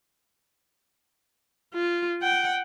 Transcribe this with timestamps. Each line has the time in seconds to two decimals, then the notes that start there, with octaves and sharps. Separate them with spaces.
1.74 F4
2.22 F#5 G5